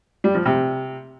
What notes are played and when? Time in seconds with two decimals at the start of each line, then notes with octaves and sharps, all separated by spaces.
0.24 G3
0.35 F3
0.46 C3